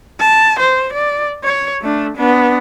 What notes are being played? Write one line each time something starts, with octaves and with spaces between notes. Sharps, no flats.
A5
C5
D5
C#5
A3 D4
B3 D4